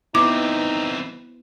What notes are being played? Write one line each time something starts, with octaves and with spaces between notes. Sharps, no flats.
E3 B3 C4 D#4 E4 D6